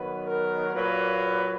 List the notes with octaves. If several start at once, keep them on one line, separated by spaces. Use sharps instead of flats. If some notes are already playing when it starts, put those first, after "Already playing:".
Already playing: D#3 F#3 B3 B4
A#4
A#2 F#3 A#3 B4